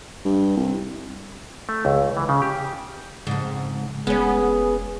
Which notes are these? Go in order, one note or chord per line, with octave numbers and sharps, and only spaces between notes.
G2
C2
A3
C#2
E3
C#3
G4
F2 G#2 C#3
F1 G#3 B3 C#4 G#4